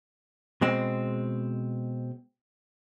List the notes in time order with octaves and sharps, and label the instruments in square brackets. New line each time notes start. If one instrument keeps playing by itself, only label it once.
[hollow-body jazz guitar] B2 G#3 C4